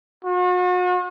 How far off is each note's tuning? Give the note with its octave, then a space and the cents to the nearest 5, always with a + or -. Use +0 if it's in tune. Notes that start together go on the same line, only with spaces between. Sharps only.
F#4 -40